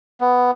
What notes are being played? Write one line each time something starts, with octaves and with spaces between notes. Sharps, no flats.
B3